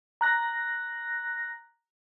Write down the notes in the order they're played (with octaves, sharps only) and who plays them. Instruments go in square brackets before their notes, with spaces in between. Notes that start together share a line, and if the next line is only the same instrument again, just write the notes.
[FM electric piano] A#5 F#6 A#6